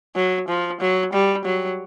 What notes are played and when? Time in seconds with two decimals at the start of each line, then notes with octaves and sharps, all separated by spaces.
0.16 F#3
0.48 F3
0.80 F#3
1.13 G3
1.45 F#3